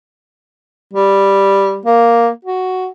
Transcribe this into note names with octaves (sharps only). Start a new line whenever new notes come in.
G3
A#3
F#4